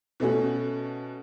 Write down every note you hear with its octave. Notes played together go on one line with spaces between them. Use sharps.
B2 A3 C#4 F#4